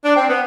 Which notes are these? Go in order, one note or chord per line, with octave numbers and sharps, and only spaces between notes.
D4
C4
B3